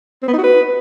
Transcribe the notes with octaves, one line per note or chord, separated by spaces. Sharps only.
C4
B3
D#4
F#4
B4